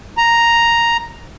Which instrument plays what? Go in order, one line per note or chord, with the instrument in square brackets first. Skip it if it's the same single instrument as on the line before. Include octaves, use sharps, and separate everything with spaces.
[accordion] A#5